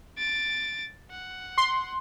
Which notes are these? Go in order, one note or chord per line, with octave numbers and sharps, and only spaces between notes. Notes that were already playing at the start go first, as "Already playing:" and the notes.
A6 D7
F#5
C6